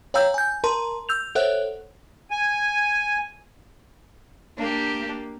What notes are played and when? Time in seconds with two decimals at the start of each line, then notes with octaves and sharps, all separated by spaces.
0.14 C#5 F5 G5 A#5 E6 G6
0.34 G#5 G6
0.64 A#4 A5 A#5 C6
1.09 E6 G6 F7
1.35 A4 C5 C#5 E5 F#5 F#6
2.31 G#5
4.58 A#3 D4 G4